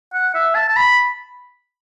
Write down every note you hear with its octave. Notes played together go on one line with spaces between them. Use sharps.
F#5
E5
A5
A5
B5